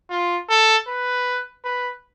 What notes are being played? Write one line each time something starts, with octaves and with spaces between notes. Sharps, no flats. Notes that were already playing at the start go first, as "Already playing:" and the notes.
F4
A4
B4
B4